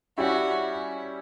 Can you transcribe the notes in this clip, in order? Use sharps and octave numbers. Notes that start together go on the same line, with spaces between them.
G3 C#4 E4 F#4 G4